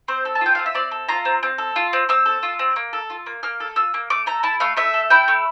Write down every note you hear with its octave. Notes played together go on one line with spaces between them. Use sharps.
C4 C5
A4
A5
F4 G5
C4 F5
E5
C4 D5
A4
F4 A#5
C4
C4
A4
F4
C4
C4 E6
A4
F4
C4
A#3
A4
F4
A#3
A#3 F6
A4
F4 E6
A#3
A3 D6
A4 A#5
E4 A5
A3 F5
A3 E5
A4
E4 G5
A3